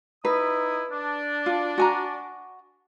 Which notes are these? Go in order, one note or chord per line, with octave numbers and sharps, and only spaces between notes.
D#4 E4 B4 D#6
D4
F4
F#4 G#5 A#5